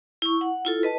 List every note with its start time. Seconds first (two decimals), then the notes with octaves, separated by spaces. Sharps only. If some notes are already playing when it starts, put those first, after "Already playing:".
0.22 E4 C#6
0.41 F#5
0.65 E4 F4 A4
0.83 B4 D#5 A5